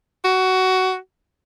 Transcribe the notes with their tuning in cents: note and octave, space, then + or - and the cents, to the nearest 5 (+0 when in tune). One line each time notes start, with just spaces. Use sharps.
F#4 +15